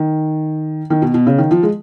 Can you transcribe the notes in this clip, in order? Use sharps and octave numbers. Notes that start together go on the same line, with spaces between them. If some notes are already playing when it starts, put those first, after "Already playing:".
Already playing: D#3
D#3
B2
B2
C#3
D#3
F3
G#3